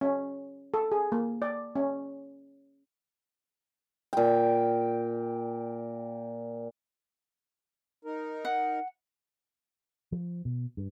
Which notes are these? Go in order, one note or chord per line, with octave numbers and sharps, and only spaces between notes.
C#4
A4
G#4
A#3
D5
C#4
A#2 G5
D#4 A#4
F#5
F3
B2
G2